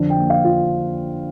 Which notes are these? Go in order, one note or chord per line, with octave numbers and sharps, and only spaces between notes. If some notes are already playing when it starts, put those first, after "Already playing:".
Already playing: F2 D3 D4
G5
A#3
F5
F4